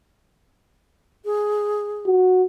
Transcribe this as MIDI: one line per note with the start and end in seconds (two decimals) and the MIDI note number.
1.25 2.08 68
2.07 2.44 66